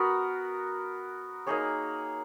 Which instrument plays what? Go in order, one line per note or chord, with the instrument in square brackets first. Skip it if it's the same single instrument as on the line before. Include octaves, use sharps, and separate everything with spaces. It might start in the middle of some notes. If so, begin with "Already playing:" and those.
Already playing: [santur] B3 F#4 A#4
A#3 D#4 G#4 C#5